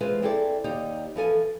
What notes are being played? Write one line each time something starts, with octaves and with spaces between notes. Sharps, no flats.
E3 G#3 F4 B4 C5
C4 E4 G#4 A4 C5 D5
D#2 D#4 G4 D5
E3 F3 A4 G#5